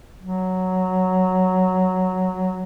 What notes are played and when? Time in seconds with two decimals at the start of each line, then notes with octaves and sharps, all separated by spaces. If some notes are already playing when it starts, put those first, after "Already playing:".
0.21 F#3